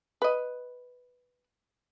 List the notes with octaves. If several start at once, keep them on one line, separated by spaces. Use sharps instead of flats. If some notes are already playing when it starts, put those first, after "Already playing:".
B4 D#5